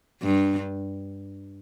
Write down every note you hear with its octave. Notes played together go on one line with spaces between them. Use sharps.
G2